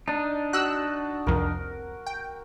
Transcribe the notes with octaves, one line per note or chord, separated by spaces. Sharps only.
D4 D#4 A5
F#4 E6 F#6
C2 F2 A#4
G5